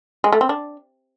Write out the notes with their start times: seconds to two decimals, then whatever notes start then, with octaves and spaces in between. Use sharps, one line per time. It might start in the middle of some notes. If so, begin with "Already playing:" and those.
0.24 G#3
0.32 A3
0.41 C4
0.49 D4